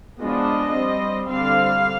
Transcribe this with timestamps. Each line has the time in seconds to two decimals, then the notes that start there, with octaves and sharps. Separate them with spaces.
0.20 F3 G#3 B3 D4 D#5
0.74 G3 C4
1.28 D3 G3 C4 F5